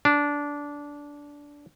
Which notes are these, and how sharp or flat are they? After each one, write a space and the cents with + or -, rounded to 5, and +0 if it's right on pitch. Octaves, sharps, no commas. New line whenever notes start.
D4 -15